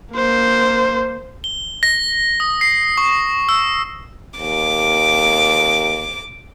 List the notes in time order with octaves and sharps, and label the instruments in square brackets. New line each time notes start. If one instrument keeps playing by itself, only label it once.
[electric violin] A#3 C5
[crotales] G7
A#6
D#6
C7
C#6
E6
[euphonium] D#2 [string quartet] D6